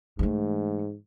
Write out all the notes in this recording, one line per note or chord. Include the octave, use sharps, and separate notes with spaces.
G#2 E3 A3